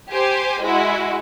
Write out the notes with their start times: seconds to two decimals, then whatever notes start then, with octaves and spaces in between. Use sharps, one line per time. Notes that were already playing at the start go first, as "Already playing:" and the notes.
0.11 G4 C5 G#5
0.63 G#3 E4 F#4